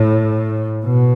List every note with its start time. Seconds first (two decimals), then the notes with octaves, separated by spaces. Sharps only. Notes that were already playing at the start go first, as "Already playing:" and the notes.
Already playing: A2
0.85 B2